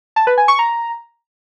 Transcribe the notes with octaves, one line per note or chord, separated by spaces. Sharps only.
A5
B4
G#5
C#6
A#5